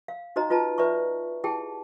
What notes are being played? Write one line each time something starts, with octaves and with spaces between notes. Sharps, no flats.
F5
D#4 F#4 C5 D#5 A#5
F4 B4 D#5 A5 A#5
B4 C5 D5 E5 A#5 C#6
E4 G4 G#4 G5 A5